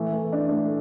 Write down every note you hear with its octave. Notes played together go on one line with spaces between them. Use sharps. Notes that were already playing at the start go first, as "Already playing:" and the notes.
Already playing: E3 A3
A3
D4
A3